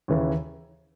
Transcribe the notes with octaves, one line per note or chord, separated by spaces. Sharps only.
D#2 C#3 E3